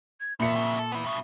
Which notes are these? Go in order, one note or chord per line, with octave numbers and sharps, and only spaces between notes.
G#6
E2 A#2 E5 C#7
F2 C#3
A4
B3 E4
G2 B2 E5